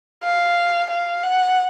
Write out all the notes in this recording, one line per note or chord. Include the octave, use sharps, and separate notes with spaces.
F5
F5
F#5